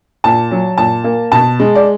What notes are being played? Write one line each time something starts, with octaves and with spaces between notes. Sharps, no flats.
A#2 A5
F#3
A#2 A5
A#3
B2 A5
G#3
D5